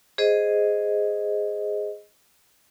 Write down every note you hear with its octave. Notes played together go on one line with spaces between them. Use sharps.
G#4 C5 D#5